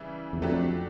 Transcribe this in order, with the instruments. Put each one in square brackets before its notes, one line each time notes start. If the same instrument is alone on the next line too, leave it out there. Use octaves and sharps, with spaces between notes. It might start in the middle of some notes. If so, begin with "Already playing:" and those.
Already playing: [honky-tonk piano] C#3 E3 G3 E4
[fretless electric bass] E2
[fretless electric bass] F2 [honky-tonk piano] F#3 A3 D4 G4